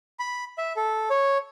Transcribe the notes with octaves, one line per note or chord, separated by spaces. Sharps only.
B5
E5
A4
C#5